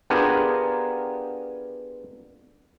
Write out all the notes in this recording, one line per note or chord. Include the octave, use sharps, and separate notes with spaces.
B3 D4 F4 G4 G#4 A#4